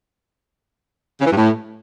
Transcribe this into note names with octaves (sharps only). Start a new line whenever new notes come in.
C#3
E3
G2
A2